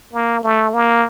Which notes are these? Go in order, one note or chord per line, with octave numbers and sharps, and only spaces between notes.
A#3
A3
A#3